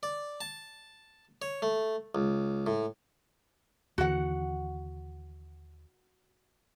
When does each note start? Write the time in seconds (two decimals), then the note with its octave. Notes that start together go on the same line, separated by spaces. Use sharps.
0.03 D5
0.41 A5
1.42 C#5
1.62 A3
2.15 C#2
2.67 A2
3.98 D#2 D3 E3 F#4 F#5